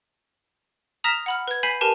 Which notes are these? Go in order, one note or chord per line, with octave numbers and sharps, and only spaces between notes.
A#5 D#6 F6 A#6 B6 E7
F#5 B5 F6
B4 G#6
G#5 B5 G6 B6 C7
G4 A#4 B4 G#5 A5